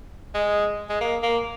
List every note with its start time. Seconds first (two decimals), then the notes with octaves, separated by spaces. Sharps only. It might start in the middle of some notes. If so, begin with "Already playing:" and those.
0.34 G#3
0.89 G#3
1.00 A#3
1.23 A#3